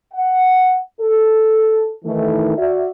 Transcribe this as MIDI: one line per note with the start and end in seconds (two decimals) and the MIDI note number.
0.13 0.78 78
1.01 1.94 69
2.05 2.56 51
2.05 2.56 52
2.05 2.56 57
2.57 2.88 66
2.57 2.88 74
2.57 2.88 76